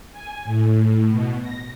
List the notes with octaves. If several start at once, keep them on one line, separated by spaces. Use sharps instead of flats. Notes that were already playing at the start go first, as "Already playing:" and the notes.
G#5
A2
B2
A#6